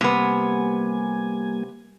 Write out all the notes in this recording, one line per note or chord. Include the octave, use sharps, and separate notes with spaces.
C3 G3 A#3 B3 G#5